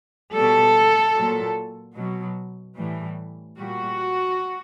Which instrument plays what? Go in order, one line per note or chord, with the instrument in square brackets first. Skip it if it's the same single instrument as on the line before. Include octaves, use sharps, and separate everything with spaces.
[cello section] B2 G3 A4
A#2 F#3
B2 F#3
A2 E3 G3
A#2 G3 F#4